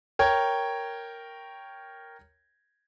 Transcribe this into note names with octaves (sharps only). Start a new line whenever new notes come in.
A#4 C#5 G5 G#6